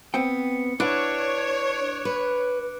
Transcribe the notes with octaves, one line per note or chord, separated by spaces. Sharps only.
B3 C4 G5 C#7
D4 E4 B4 C#5 F#5 D6 F#6 D7
B4